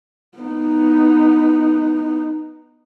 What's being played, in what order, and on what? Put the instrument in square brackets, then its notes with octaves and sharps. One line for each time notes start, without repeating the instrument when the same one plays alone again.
[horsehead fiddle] B3 D#4